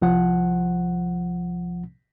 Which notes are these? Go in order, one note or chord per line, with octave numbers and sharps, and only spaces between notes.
C2 F3 F#5